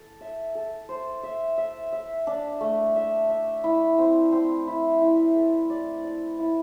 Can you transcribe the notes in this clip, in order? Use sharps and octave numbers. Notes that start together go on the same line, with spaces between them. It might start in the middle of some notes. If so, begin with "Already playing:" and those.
Already playing: A4
E5
A4
C5
E5
E5
E5
D4
A3
E5
E5
E4
C4
C4
E4
E4
A4
D5
D5
E4